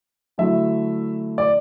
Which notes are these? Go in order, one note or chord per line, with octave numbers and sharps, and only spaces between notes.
D3 F#3 A3 E4 E5
D5